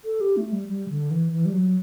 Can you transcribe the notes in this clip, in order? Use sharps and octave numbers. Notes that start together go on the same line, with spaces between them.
A4
G4
A3
G3
G3
D3
E3
E3
G3
F#3